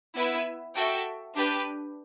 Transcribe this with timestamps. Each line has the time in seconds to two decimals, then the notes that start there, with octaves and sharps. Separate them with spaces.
0.15 B3 E4 B4 E5
0.75 F#4 A4 E5 G5
1.35 D4 G4 B4